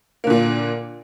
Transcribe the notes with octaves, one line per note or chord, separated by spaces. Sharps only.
A#2 D3 A#3